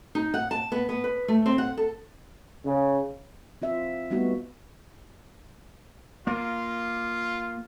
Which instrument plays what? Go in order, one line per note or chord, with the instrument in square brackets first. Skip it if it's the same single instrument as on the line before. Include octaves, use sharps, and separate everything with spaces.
[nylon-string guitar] D#4
F#5
A5
B3
B3
B4
A3
C4
F#5
A4
[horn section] C#3
[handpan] C4 F4 E5
G3 A3 B3 D#4 F#4
[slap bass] A#3 [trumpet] F4